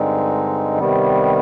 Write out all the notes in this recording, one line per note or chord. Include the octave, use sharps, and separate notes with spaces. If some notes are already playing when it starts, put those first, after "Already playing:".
Already playing: G2 D3 G#3 C4 D#4
C3 D#3 G3 B3